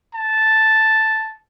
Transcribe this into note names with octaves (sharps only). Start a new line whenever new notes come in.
A5